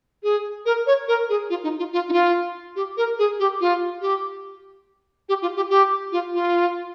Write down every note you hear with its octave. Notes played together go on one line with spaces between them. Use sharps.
G#4
A#4
C#5
A#4
G#4
F4
D#4
F4
F4
D#4
F4
G4
A#4
G#4
G4
F4
G4
G4
F4
G4
G4
F4
F4